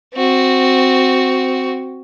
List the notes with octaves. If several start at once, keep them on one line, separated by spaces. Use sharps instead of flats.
C4 F#4